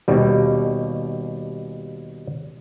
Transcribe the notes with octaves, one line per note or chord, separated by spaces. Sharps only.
D#2 B2 G3